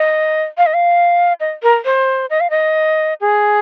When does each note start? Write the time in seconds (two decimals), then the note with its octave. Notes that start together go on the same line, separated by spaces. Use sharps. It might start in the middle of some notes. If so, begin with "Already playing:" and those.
Already playing: D#5
0.58 F5
0.66 D#5
0.74 F5
1.40 D#5
1.63 A#4
1.85 C5
2.30 D#5
2.40 F5
2.50 D#5
3.21 G#4